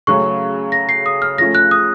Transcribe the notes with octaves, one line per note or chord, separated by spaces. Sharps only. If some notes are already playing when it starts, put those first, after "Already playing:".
C#3 F#3 A3 C#4 C#6
A#6
C7
D#6
F6
C#3 F3 A3 C#4 A#6
F#6
D#6